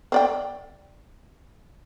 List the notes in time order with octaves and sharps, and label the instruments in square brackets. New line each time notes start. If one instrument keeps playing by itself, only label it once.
[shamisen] C4 D5 G5